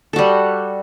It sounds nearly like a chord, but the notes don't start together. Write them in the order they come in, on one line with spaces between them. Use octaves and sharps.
A4 F#4 G3